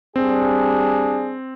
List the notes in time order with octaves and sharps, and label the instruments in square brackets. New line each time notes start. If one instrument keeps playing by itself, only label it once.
[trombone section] G3 D4 G#4 [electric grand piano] C4